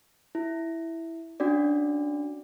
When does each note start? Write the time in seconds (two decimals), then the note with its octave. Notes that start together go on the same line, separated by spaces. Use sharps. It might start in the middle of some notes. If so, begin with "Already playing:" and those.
0.35 E4
1.40 C#4 D4 F#4 D5